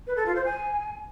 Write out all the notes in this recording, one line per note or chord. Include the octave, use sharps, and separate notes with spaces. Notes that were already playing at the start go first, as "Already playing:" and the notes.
B4
A4
F4
C5
G#5